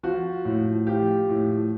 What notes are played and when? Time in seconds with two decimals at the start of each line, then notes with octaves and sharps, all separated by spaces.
0.03 F3 F#4
0.45 A2
0.87 F3 G4
1.29 A2